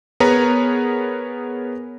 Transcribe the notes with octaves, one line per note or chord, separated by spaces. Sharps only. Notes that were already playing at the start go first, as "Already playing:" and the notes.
B3 G#4 A#4 B4 C#5 A#5